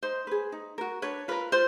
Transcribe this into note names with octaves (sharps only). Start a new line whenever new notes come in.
D#4 C5
G#4 B4
D#4
F#4 A#4
D4 B4 C#5
F4 A#4 B4
F4 C5